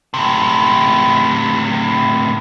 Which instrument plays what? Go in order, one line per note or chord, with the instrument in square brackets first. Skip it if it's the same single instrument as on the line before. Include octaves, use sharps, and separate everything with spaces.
[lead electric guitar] A2 C3